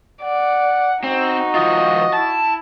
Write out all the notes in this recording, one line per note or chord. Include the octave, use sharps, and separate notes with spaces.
D5 F#5
C4 D#4 F#4
D#3 F3 F4 D#5
E4 A5